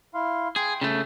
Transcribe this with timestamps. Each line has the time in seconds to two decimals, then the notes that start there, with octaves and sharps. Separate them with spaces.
0.14 E4 F5 C6
0.56 G#4 G5 C6
0.81 C#3 A3